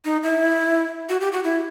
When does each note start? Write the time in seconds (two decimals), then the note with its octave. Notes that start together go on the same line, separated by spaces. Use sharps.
0.05 D#4
0.23 E4
1.09 F#4
1.21 G4
1.32 F#4
1.44 E4